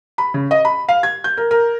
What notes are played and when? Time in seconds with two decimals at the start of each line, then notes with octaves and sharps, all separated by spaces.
0.18 B5
0.34 C#3
0.51 D#5
0.65 B5
0.88 F5
1.03 G#6
1.24 G6
1.37 A#4
1.51 A#4